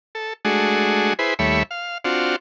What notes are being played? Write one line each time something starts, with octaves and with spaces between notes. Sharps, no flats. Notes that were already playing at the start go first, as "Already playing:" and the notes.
A4
G#3 A3 D4 F#4 G#4
E4 G#4 B4 C5
D#2 G3 A3 C#5 E5 B5
F5
C4 D4 F4 F#4